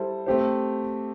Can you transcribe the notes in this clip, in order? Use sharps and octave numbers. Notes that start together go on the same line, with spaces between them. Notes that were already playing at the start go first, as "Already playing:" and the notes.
Already playing: G3 E4 A4 C5
A3 C4 G4 C5